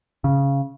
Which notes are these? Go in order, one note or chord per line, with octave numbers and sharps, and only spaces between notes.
C#3